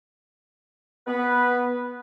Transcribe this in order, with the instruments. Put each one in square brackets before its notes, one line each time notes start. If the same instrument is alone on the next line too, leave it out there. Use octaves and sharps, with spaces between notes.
[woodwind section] B3 B4